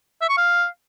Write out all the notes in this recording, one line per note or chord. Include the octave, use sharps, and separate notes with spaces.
E5
C#6
F5